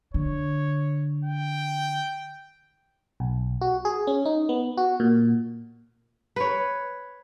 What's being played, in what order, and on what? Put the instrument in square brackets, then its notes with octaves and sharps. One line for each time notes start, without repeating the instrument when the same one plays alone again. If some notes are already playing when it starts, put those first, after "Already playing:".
[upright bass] D3 [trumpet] C#5
[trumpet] G5
[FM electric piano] B1
F#4
G#4
C#4
D#4
B3
F#4
A#2
[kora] B4 C#5